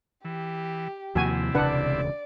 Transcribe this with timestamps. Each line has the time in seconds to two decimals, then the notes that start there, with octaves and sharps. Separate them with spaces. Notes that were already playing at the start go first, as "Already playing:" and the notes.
0.25 E3 G4
1.15 D#2 C3 F3 A#3 E4 F#4 G#5
1.55 E1 D2 C#3 D4 B4 D5 F#5